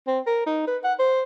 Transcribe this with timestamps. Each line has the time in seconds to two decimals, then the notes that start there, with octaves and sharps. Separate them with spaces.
0.08 C4
0.27 A#4
0.46 D#4
0.67 B4
0.84 F#5
1.00 C5